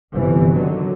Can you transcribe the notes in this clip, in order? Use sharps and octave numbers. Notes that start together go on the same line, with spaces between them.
G1 C3 E3
D3 D#3 F#3